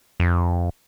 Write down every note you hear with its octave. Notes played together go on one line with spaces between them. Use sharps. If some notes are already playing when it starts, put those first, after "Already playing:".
F2